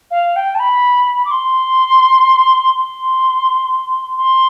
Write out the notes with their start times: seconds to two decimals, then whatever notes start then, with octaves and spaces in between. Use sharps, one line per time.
0.11 F5
0.36 G5
0.55 A5
0.59 B5
1.25 D6
1.31 C6
2.74 C6
4.17 C6